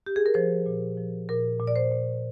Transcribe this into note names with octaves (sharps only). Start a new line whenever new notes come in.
G4
G#4
A#4
F3 C5
A#2
F3
A#2 A#4
A#2
D5
C5
A#2